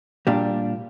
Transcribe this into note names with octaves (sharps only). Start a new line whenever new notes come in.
A#2 G3 D4